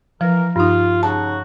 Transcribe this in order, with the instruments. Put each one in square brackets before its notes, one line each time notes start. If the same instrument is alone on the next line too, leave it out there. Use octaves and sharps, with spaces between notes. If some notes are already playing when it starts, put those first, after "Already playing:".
[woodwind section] E3 A#4 [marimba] F3
[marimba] G2 D#4 [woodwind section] F4
[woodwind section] C#3 D#4 F#4 [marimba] A5